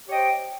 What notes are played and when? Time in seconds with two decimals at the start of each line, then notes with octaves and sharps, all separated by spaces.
0.05 C#5
0.07 G4
0.10 G5
0.12 D#5
0.15 C5